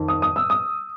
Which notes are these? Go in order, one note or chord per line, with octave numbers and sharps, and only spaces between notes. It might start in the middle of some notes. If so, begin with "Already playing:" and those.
Already playing: F2 D#3
D#6
D#6
E6
D#6